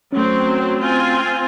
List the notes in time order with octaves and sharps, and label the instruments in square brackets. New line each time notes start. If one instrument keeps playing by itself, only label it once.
[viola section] F#3 C4 [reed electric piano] A3 C#4
[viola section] C4 F4 G#5